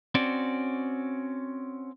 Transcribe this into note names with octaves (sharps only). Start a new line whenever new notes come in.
C4 C#4 F#4 D5